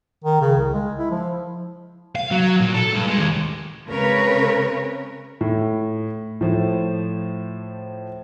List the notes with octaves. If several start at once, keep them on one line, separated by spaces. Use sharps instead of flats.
D#3
C#3
C2
G#3
E4
F3
F5
F#3
A#2
A4
G2
G#3
D#2
C#3 G#3 C4 A#4 B4 C#5
A2
A2 F3